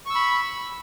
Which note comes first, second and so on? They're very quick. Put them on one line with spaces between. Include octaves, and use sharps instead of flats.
C#6 E6 B5